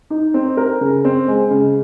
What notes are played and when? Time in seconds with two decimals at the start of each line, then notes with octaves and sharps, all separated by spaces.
0.10 D#4
0.34 C4
0.57 A#4
0.81 C#3
1.04 C4
1.28 G#3
1.50 C#3